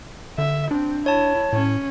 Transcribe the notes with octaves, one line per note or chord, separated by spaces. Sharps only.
D3 E5
C4 D4
E4 C#5 A5
A2 C#4